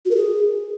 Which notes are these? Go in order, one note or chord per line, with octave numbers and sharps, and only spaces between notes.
F#4
A#4
G#4